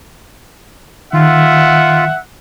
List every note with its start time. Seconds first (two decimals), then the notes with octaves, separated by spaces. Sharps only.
1.13 D#3 F4 E5 F#5